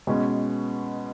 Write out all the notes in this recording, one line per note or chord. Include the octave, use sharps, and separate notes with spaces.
B2 G#3 C#4